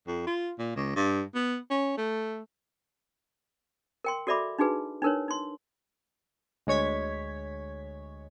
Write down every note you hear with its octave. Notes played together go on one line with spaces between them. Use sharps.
F2
F4
A#2
C#2
G2
B3
C#4
A3
A#4 G5 C6
F#4 A4 D5 E5 B5 D6
D4 D#4 F#4 G#4 B4
D4 D#4 A#4 B4 C#5
D#4 C6
D2 G#3 C#5 G#6 B6